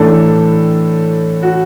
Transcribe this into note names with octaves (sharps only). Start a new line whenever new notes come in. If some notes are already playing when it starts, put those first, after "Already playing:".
Already playing: A2 E3 A3 D4 A4
F#4